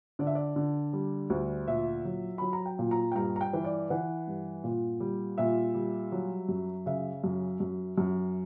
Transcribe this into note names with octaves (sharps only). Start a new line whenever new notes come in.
D3 D5
E5
D5
D3
G3
D2
A#2 E5
F#3
F#3 B5
A#5
G5
A#2
A#5
G5
G2 A#5
A#5
G5
E3
D5
E3 F#5
G2
A#2
G3
A#2 E5
G3
F#3
F#2
C#3 E5
F#2
F#2
F#2